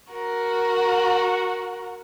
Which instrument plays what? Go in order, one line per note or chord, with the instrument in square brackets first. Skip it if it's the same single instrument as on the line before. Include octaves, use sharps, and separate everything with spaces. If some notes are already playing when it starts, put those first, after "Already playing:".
[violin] F#4 A#4